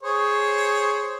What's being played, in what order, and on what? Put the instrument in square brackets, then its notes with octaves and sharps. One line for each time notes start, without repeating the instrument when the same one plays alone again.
[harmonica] G#4 C5 C#5